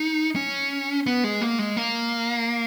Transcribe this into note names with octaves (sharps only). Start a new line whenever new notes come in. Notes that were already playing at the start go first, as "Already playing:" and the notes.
Already playing: D#4
C#4
B3
G#3
A#3
G#3
A#3